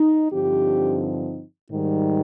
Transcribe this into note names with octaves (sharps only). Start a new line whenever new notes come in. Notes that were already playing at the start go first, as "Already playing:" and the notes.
Already playing: D#4
G2 D3 F3 C4 D#4 G4
G#2 D#3 G3